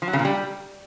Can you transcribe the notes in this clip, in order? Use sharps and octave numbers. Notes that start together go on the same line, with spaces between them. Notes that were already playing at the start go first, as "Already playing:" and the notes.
F3
F#3
C#3
A#2
G3